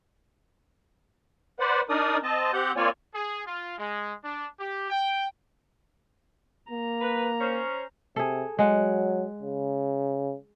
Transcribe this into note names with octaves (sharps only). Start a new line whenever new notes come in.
B4 C5 D5 F#5
D4 D#4 A#4 D5 D#6
C4 D#5 A5
C4 G4 F#5 G6
A#3 C4 F4 C#5 D5 G#5
G#4
F4
G#3
D4
G4
G5
A#3 A#5
B4
C#4 C5
C3 G#4 A4
F#3 G#3 F#5
C#3